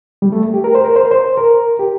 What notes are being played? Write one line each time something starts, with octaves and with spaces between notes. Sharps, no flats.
G3
A3
G4
A#4
C5
A#4
C5
A#4
C5
A#4
G4